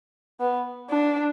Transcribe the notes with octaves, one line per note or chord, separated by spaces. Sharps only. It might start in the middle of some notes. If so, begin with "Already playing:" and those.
B3
D4